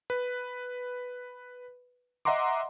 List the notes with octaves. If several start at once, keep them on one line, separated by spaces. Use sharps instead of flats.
B4
D#5 E5 F#5 A#5 C6 D6